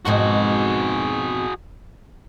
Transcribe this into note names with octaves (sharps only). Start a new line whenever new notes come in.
F2 G#2 B2 F#4 G#4